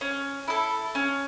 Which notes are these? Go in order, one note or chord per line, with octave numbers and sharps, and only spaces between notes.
C#4
E4 A4
C#4